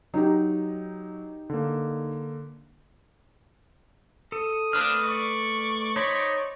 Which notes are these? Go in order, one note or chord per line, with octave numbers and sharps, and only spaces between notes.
F#3 D#4 G4
D3 A#3
A4 D#6
A3 A#3 C4 D4 B4 F6
D5 C#6
D#4 C5 C#5 B5